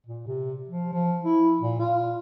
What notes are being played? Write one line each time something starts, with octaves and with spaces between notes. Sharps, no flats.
A#2
C3
F3
F3
E4
A#2
F4